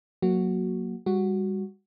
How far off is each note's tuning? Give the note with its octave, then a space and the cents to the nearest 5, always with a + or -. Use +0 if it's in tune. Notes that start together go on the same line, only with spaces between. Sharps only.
F#3 -10 A#3 +0 F#4 +0
G3 +30 F#4 +0